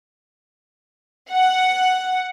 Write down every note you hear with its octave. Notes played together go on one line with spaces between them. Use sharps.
F#5